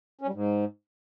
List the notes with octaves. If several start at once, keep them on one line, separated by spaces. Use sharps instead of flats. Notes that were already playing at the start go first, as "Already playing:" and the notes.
C#4
G3
G#2